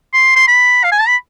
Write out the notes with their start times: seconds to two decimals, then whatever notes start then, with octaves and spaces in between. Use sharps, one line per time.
0.14 C6
0.36 C6
0.48 B5
0.84 F5
0.92 G#5
1.00 A5
1.08 B5